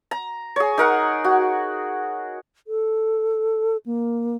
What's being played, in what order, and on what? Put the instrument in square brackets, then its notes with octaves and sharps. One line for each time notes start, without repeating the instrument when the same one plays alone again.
[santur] A#5
G#4 C#5
D#4 A#4 F#5
F#4
[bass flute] A4
A#3